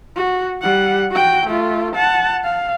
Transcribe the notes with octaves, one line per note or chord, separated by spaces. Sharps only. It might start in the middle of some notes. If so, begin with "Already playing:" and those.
F#4
G3 F#5
F#4 G5
A3 F4
F#5 A5
F5